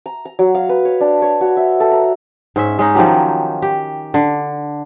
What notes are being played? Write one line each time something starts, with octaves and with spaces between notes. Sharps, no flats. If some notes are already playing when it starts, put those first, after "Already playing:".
A#5
A#5
F#3
F5
B4
C#5
D4
C#5
F#4
E5
A4
A#5
G#2 C#4 E5
G#3 C#4 D#4
D#3 F3 F#3 G4
G4
D3